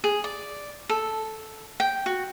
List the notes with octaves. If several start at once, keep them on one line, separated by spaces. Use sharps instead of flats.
G#4
D5
A4
G5
F#4